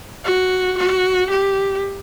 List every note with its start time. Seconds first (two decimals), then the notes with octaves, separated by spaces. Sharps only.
0.25 F#4
0.77 F#4
1.30 G4